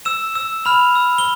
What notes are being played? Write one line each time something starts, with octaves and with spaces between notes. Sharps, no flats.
E6 E7
E6
B5 F6 F7
E6
G7